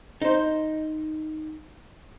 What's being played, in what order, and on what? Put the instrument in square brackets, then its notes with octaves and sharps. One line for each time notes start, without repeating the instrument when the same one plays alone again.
[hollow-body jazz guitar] D#4 C5